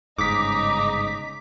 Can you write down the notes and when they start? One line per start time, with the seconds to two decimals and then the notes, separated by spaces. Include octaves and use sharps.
0.18 G1 G#2 C#3 D#4 D6 D#6 B6